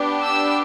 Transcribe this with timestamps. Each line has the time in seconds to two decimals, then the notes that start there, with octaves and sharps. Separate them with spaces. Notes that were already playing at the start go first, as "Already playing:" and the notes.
Already playing: B3 D4 G4
0.22 E6